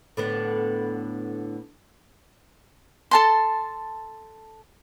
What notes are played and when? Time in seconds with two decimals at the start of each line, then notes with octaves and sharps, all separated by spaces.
0.17 A2 D3 B3
3.11 A4 A5 C6